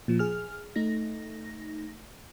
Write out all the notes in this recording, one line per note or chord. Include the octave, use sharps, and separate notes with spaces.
A#2 F3
G#4 F6
A3 D#4 A#6